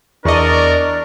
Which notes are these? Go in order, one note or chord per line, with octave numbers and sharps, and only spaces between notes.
E2 D4 A#4 D5 D#5 C#6